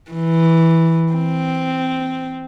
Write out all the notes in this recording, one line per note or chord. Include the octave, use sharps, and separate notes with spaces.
E3
C4